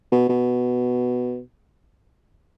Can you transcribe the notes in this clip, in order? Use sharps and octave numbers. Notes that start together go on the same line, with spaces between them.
B2
B2